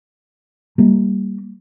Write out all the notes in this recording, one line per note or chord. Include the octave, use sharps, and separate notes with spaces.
G3 A#3